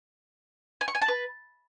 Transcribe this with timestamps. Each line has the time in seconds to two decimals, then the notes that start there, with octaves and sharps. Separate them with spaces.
0.81 G#5
0.88 C#6
0.95 G#5
1.01 A5
1.08 B4